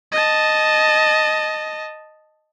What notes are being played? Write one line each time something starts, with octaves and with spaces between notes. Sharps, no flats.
D#5 A5